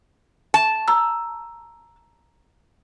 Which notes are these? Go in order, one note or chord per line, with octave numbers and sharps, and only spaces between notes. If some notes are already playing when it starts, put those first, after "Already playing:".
A5
A#5 E6